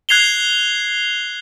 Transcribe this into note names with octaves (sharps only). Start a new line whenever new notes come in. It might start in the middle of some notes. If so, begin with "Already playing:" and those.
F#6 G#6 C7 F7 G7